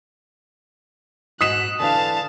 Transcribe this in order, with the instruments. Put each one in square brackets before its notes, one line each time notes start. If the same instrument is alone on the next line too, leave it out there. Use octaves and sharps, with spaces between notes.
[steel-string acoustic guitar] G#2 F#4 [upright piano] D#6 B6 E7 [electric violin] F#6
[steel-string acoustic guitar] D3 E3 A4 [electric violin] F5 A5